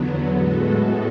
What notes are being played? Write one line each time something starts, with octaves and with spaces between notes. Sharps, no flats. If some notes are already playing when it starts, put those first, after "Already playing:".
Already playing: E2 D3 F#3 B3
A2 G#3 B3 F#4 A4